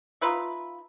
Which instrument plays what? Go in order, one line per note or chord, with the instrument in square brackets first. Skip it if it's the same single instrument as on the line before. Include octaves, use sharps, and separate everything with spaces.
[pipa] D#4 F4 B4 E5